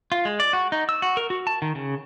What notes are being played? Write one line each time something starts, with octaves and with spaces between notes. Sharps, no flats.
F4
G#3
D5
F#4
D#4
E6
F#4
A#4
F#4
A5
D#3
C#3